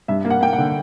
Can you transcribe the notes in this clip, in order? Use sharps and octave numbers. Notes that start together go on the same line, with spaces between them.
G2 E5
A#3
F#5
A#3 G5
F#5
D3